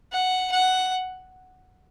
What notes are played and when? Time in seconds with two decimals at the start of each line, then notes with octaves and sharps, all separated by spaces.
0.13 F#5
0.51 F#5